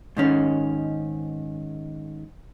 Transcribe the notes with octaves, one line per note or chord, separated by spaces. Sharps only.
G#2 D#3 C#4